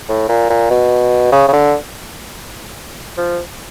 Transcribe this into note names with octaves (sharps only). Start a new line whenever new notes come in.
A2
A#2
A#2
B2
C#3
C#3
D3
F3